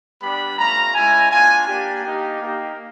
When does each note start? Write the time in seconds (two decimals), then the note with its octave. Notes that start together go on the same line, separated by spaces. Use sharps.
0.21 G3 B3 D4 G4 B5
0.58 A3 C#4 F4 A#5
0.94 G#3 C#4 E4 G#5
1.31 A#3 D4 F4 G#5
1.68 A#3 D4 G4
2.04 A#3 D#4 G4
2.40 A#3 D#4 G4